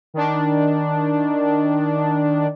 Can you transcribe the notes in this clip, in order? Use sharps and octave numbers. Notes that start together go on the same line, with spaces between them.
D#3 D4